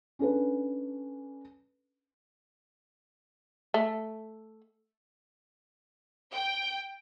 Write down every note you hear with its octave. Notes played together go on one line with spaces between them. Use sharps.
C#4 D4 A4 B4
A3
G5